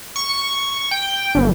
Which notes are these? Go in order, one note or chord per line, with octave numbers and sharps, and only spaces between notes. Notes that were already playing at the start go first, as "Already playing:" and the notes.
C#6
G5
G1